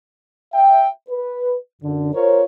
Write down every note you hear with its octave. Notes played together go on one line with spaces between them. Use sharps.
E5 G5
B4
F#2 D3
F4 A#4 C5 C#5